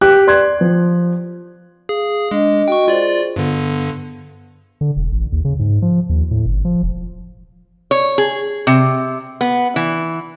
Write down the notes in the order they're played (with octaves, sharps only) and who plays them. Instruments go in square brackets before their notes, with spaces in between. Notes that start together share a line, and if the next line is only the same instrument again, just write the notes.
[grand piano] G4 F#6
D5 C6 F#6 G#6
F3
[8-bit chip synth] G#4 [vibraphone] F5
[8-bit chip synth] G#3 [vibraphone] D4 D#5
[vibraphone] F#4 D#5 [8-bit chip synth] G5 C#6
[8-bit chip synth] F4 D5 [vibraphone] G#4 C5
[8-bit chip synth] G2 D3 [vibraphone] B3
[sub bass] D3
E1
A1
D#2
C#3
G#2
F3
D#2
A2
G1
F3
E1
[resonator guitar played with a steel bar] C#5
G#4
C3
B3
E3